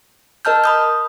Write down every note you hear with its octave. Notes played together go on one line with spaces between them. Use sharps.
A#4 D#5 A5 F6 G6
B5 D#6 G6